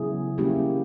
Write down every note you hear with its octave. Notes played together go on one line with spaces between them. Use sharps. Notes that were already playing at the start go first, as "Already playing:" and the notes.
Already playing: C#3 F#3 B3 E4 G#4
G3 A#3 C#4 E4 G4